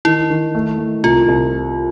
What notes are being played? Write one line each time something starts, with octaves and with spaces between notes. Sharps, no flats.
D#3 E4
D#3
A3
A3
C2 F4
C2